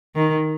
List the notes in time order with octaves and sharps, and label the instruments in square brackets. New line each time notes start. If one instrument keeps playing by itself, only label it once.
[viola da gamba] D#3